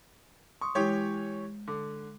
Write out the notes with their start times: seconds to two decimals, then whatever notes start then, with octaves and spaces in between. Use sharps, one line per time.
0.61 C6 C#6 D#6
0.75 E3 G#3 G4 C#5
1.68 D3 D6